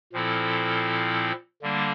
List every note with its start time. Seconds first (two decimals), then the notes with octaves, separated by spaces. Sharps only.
0.13 A#2 F3 C4 E4 A4
1.62 D3 G3 A#3 D4